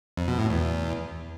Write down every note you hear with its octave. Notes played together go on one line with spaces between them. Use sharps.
F2
B2
A2
E2